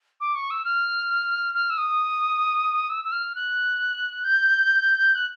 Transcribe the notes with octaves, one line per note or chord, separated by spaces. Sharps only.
D6
C#6
E6
F6
F6
E6
D#6
E6
E6
F6
F#6
G6
F#6